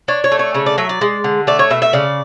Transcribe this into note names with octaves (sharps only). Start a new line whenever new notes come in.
D4 C#5
C#5
A3
C#5
C#3 C#5
D5
F#3 E5
D5
G#3
D3
A3 D5
C#5
B2 E5
E5
C#3 D5